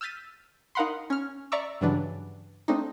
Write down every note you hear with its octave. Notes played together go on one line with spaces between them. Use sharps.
E6 F6 G6 A6 B6 D#7
D#4 A#4 F5 F#5 B5 C6
C#4 F6
D5 E5 A#5 C#6 D6 E6
G2 C#3 E3 F#3 D4
A3 C4 D4 D#4